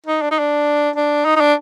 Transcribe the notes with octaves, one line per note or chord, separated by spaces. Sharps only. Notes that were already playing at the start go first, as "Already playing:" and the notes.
D#4
D4
D#4
D4
D4
D#4
D#4
D4